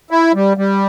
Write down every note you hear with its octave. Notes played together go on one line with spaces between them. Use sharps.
E4
G3
G3